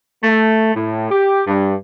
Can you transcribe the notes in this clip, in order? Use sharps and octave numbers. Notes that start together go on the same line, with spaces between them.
A3
A2
G4
G2